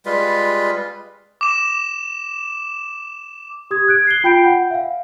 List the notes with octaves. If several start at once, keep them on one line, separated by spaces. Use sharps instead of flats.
G3 G#3 F4 B4
D6 E7
G4 D#6 G#6
F#6 G#6 D7
C7 G7
F4 G5 B5 G6 C7 D7
F#5
E5 F5